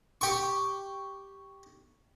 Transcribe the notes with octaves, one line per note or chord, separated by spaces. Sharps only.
G4 C#6